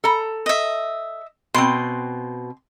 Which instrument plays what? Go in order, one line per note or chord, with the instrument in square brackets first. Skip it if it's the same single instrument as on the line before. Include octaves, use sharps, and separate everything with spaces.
[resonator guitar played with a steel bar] A4 A#5
[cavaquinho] D#5 E5
[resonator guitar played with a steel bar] B2 C4 [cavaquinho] C6